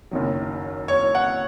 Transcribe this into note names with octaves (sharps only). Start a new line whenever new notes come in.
F#1 F#2 D#3 F#3
C#5
F#5